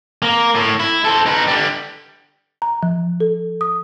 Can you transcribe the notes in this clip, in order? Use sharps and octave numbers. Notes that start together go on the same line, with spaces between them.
A#3
A2
E4
A4 C5
D#4 B4
D3 G3
A#5
F3
A4
D#6